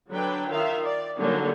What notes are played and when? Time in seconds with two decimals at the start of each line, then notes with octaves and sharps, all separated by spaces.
0.10 D3 F#3 D4 B4 G5
0.49 D#3 F4 E5 F5
0.85 D5
1.18 D3 F#3 G3 A#3 C#4 D#4